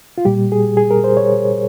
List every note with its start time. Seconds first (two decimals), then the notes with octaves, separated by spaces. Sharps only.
0.18 F4
0.25 A#2 G3 G4
0.52 G#4
0.77 G#4
0.91 A#4
1.04 C5
1.17 C#5